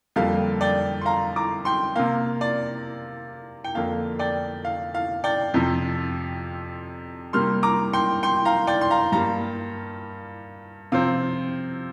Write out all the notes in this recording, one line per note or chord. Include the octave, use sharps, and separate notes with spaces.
F2 D3 G3 A#3 F5
D5 G5
C6
F5 A#5
A#5 D6
G5 C6
C3 A#3 F5
D5
G5
F2 D3 A#3 F5
D5 G5
F5
F5
D5 G5
F2 C3 F3
C3 G3 A#3 C6 F6
A#5 D6
G5 C6
G5 C6
F5 A#5
D5 G5
C6
F5 A#5
G2 G3 A#3 F5 A#5
C3 F3 C4 F5